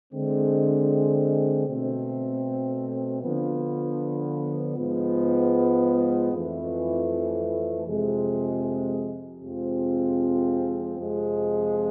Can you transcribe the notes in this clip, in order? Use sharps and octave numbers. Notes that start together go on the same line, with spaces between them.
D3 G#3 C4
B2 A3 C4
D3 F3 B3
G#2 F3 G#3 B3
F2 E3 A3
F2 C3 G#3
F2 C3 F3 G#3 C4
F2 C3 F3 G#3